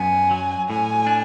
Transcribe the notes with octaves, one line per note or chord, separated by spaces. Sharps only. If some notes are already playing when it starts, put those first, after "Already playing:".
Already playing: F#2 B3 G#5
F#3
A2 G#5
D4